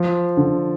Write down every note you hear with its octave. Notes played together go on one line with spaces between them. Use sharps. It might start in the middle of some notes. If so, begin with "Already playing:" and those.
Already playing: F3
D3